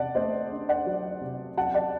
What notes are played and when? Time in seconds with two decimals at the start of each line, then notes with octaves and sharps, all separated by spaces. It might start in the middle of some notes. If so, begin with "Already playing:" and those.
Already playing: C3 D5 F#5 A5
0.15 A3 C5 D#5
0.51 D4
0.69 D5 F#5
0.86 F#3
1.21 C3
1.57 F#3 F#5 A5
1.74 D5 F#5